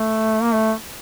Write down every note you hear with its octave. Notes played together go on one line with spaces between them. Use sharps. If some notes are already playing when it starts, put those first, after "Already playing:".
Already playing: A3
A#3
A3